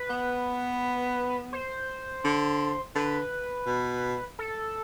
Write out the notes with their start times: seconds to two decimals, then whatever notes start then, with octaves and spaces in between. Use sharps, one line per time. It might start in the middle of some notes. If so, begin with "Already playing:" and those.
Already playing: B4
0.10 B3
1.53 C5
2.24 D3
2.95 D3 B4
3.67 B2
4.39 A4